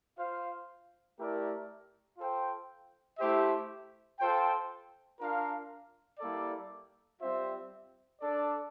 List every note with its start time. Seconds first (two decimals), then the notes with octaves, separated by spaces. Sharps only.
0.17 F4 C5 F5
1.17 A3 E4 G4 A#4 D5
2.18 F4 A4 C5 G5
3.18 A3 E4 G4 C5 E5
4.19 F4 A4 C5 G5
5.20 D4 F4 A#4 F5
6.19 G3 A#3 E4 A4 D5
7.21 G3 C4 F4 C5 E5
8.21 D4 A4 D5